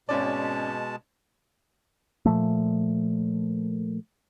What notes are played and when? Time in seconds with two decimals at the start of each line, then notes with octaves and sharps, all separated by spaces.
0.09 G#1 B2 G#3 C#4 D5 A5
2.25 A#2 F3 A3